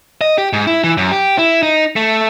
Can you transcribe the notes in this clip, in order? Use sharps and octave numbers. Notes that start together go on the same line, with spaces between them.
D#5
G4
G#2
E4
E3
F#2
G4
E4
D#4
A3